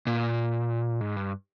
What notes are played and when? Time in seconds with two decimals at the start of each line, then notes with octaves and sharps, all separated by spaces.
0.07 A#2
1.01 G#2
1.17 G2